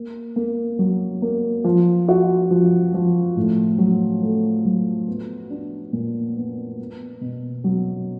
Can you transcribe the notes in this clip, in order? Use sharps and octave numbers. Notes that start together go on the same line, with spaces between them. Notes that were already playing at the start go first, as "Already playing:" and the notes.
Already playing: A#3
A#3
F#3
A#3
F3
F#4
F3
F3
A2
F#3
A3
F#3
B3
D4
A#2
B3
B3
B2
F#3